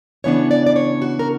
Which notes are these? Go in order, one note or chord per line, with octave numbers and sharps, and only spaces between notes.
C#3 E3 B3 D4 C#5
D5
D5
C#5
F#4
A#4